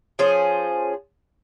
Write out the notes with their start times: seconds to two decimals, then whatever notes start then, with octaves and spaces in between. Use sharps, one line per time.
0.19 F3 C#4 G#4 C5